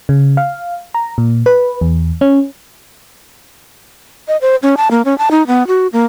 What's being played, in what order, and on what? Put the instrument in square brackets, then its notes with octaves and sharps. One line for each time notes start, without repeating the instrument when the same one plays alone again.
[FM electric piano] C#3
F5
A#5
A#2
B4
E2
C#4
[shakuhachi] D#5
C5
C#4
A5
A#3
C#4
A5
D#4
B3
F#4
A#3